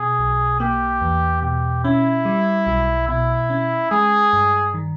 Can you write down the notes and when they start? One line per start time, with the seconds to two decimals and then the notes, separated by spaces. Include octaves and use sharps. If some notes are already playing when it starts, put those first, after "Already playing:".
Already playing: B2 G#4
0.19 B1
0.60 A#3 G4
1.01 E2
1.42 B2 G4
1.84 C#4 E4
2.25 G3
2.67 B1
3.08 B2 E4
3.50 C#4
3.91 G#3 G#4
4.33 G2
4.74 D#3